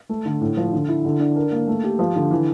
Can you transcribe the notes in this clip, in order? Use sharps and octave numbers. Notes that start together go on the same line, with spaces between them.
A3
D3
A2
F3
D3
E4
D3
D4
A#4
A#3
A3
G4
F3
D3
E3